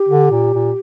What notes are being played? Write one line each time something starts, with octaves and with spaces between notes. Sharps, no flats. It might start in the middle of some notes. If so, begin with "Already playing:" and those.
Already playing: G4
D3
A#2
A#2